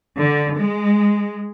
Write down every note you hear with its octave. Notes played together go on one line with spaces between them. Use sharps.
D3
G#3